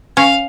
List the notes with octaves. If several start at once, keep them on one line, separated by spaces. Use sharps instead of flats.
C#4 F5